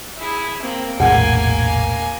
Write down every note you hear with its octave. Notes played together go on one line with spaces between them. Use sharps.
E4 G#4
A#3 C4
E1 A#1 A2 A#3 G#4 F#5 G#5